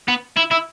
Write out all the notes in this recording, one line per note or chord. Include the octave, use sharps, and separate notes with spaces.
B3
E4
E4